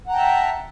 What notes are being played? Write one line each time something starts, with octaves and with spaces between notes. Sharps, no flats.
E5 F#5 G5 A5 A#5